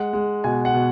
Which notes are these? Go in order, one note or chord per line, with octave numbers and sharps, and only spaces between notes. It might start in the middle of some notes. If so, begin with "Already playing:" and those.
Already playing: G#3 F#5
G#3
B2 G#5
F#5
B2